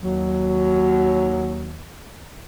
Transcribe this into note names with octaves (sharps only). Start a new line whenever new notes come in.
D#2 F#3